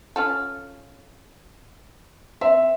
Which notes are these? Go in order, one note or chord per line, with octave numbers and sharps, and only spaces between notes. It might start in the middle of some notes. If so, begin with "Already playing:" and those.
C#4 F4 A4
C4 E5